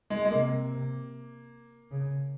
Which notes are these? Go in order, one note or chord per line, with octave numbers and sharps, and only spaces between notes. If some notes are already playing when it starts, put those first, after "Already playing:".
G#3
G#3
C3 A#3
C#3